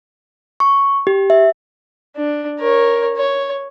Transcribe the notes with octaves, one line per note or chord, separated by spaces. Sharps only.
C#6
G4
E5
D4
A#4 C#5
C#5